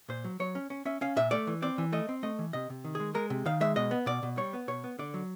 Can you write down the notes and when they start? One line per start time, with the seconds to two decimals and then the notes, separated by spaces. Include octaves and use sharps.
0.09 A#2 C5
0.24 F#3
0.40 F#3 C#5
0.55 C#4
0.70 C#4
0.85 C#4 E5
1.01 C#4 F5
1.16 A#2 E5
1.31 A3 D5
1.47 E3
1.62 C4 D5
1.78 E3
1.92 A3 D#5
2.09 C4
2.23 A3 D#5
2.39 E3
2.53 C3 D#5
2.70 C3
2.84 D#3
2.95 G#3 G#4
3.15 G#3 A#4
3.30 C3
3.46 D#3 F5
3.61 G#3 E5
3.76 B2 D#5
3.91 B3
4.06 B2 D5
4.23 B2
4.37 G3 C#5
4.53 B3
4.68 B2 C#5
4.84 B3
4.99 D3 D5
5.14 F#3